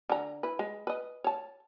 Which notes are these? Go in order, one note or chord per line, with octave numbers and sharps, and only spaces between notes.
D3 A#5
E4 B4
G#3
B4 D#5
C#5 A5